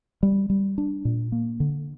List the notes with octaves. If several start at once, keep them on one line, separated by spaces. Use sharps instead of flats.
G3
G3
D4
A#2
A#3
D3